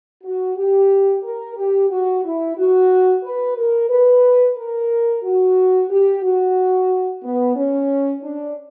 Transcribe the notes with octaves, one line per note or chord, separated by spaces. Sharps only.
F#4
G4
A#4
G4
F#4
E4
F#4
B4
A#4
B4
A#4
F#4
G4
F#4
B3
C#4
D4